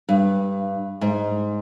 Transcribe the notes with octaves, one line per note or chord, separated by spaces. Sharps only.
G2
G#2